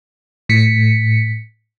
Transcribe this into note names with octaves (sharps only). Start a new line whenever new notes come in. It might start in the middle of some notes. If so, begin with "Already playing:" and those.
A2 B6 C#7